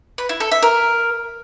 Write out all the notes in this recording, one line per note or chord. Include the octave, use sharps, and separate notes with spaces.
B4
E4
A4
E5
A#4